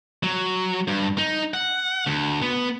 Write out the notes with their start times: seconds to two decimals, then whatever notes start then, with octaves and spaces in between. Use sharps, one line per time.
0.23 F#3
0.88 G2
1.18 D#4
1.54 F#5
2.07 D2
2.42 B3